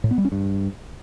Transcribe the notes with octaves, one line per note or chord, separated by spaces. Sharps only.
A2
B3
G3
C#4
G2